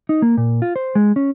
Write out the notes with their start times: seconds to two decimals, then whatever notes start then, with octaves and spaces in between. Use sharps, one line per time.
0.09 D#4
0.22 A#3
0.37 A#2
0.62 F4
0.76 C5
0.95 G#3
1.16 C#4